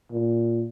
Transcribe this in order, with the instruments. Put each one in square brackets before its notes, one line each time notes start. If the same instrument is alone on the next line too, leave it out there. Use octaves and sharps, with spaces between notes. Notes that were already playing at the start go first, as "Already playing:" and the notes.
[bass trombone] A#2